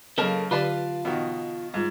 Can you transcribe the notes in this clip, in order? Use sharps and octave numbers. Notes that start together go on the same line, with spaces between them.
C#3 F#3 A#3 A4 A#4 D#5 A5
D3 F4 G4 B4 D5 F5 A5
B2 D#3 E3 F#5
G#2 G3 F4